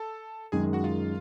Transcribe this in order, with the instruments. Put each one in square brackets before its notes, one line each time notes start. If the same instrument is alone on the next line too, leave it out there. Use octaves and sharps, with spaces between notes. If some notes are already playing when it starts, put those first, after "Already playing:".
Already playing: [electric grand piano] A4 A5
[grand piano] F#2 D#3 G#3 [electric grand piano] G#4 G#5
[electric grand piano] F#4 F#5
F4 F5